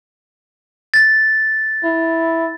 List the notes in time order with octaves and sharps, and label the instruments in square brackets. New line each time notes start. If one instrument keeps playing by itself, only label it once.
[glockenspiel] A6
[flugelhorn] E4